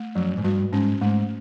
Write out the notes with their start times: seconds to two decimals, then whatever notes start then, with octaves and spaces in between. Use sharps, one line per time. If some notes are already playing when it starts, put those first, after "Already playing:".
Already playing: A3
0.15 F#2 F3
0.38 G#2
0.44 G2 F#4
0.73 G#2 C#4
1.01 G#2 A3